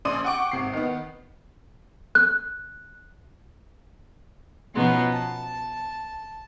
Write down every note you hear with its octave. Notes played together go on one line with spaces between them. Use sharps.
A#1 C#3 D5 C6 D#6 D#7
F#5 G5 C#6 D6 D7
G#1 C3 C7
D#3 B3
F#6
B2 F3 B3 C#4 D#4
A5